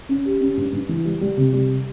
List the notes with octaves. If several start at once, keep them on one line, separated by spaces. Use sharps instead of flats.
C#4
G4
C#4
G2
G2
E3
G3
G3
C3
G3